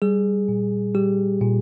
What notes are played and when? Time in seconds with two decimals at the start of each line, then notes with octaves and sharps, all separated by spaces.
0.02 G3 G#4
0.49 A#2
0.95 G3 G4
1.41 A#2